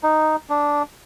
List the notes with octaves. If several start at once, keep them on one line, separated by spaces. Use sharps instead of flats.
D#4
D4